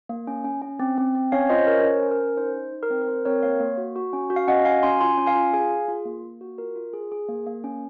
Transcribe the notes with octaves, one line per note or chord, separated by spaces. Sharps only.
A#3
C#4
C#4
C#4
C4
C4
C4
C#4 C#5 F5
F4 C5 D#5
C#4 A#4 C#5
A#4
C#4 C5
C#4
A#4
C#4
D#4 C5
D#4
D#4
A#4
C4 C5
A#4
C4 C5
C4 A#4 C#5
A#3 C#5 F5
A#3
F#4
F#4
C#4
F#4
F5
C#4 D#5 F#5
F#4 F5 G#5
C#4 G#5 C6
F4 G#5 C6
C#4
F5 G#5
F4
G#4 F5 G#5
G#4
F4
A#3
A#3
F#4
F4 A#4
F4
G#4
G#4
A#3
A#3
C#4